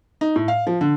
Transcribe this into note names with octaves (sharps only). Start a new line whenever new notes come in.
D#4
A2
F5
F3
D3